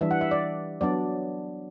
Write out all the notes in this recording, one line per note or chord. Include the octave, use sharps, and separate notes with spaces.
E3 G3 D4 E5
F#5
E5
D5
F#3 B3 D4 D5